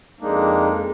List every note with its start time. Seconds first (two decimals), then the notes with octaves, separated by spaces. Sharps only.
0.20 F2 G#3 A#3 D4 D#4